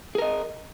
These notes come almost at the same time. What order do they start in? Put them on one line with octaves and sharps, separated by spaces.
G#4 A#4 D#5